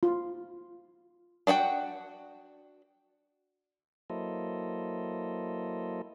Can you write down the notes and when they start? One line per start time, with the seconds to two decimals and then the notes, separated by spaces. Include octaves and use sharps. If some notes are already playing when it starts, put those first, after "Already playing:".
0.03 F4
1.47 D4 F#4 F#5 G5
4.10 F#3 A#3 E4 A4 C5 D#5